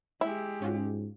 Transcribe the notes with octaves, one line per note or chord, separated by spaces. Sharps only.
G#3 E4 G4
G#2 C#4 F4 F#4